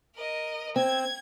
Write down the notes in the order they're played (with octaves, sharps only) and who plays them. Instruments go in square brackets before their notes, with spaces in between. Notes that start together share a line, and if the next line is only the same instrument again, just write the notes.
[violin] A#4 D#5
[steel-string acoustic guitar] C4 [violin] G#6